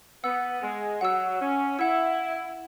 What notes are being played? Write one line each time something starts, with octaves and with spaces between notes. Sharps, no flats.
B3 F#5 E6
G#3
F#3 F#5 E6
C#4
E4 F#5 E6